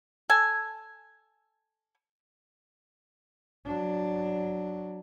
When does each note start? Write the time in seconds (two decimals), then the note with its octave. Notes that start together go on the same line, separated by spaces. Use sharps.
0.30 A4 G#5
3.66 F#3 D4